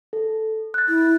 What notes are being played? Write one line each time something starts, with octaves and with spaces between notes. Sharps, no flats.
A4
F#6 A6
E4